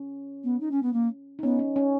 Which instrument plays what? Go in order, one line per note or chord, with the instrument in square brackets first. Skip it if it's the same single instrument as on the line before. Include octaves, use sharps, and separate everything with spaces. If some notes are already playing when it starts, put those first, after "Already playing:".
Already playing: [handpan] C#4
[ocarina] B3
D#4
C#4
B3
A#3
[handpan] D#4
[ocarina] B3 [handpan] C#4
[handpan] C#4
C#4